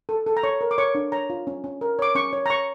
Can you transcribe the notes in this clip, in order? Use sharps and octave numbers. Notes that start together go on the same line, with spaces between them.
A4
A4
A#5
C#5 C#6
A#4
D6
C#5 C#6
D4
C#5 A#5
F4
C#4
C#4
A#4
C#5 D6
C#4 C#6
C#5
A#5
C#5 C#6